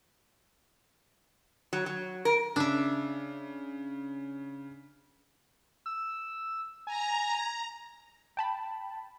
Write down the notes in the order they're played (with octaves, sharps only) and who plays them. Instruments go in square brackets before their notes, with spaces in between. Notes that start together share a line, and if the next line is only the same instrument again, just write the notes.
[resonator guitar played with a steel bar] F#3
F#3
A#4
[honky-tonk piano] C#3 [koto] D4 E5
[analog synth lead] E6
[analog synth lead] G#5 [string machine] A#5
[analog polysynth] G5 A5 B5